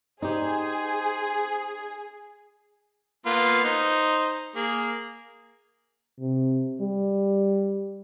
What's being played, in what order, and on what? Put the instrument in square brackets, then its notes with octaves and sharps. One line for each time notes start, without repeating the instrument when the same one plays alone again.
[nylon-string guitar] D#4 G4 [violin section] G#4 [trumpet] C5
[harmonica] A#3 B3 F4
D#4 C5
A#3 G#4
[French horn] C3
G3